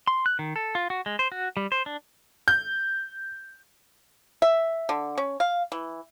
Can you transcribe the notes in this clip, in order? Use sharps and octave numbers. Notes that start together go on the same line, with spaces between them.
C6
F#6
D#3
A4
F4
F#4
G#3
C5
F#4
G3
C5
D4
G6
E5
D3
C#4
F5
E3